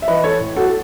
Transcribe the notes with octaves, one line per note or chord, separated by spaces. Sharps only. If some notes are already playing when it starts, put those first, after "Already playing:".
E5
E3 B4 D#5
A4 C#5
A2
F#4 A4
A4